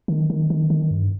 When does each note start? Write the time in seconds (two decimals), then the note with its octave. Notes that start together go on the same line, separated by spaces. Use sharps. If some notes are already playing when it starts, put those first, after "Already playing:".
0.08 D#3
0.30 D#3
0.50 D#3
0.70 D#3
0.91 G2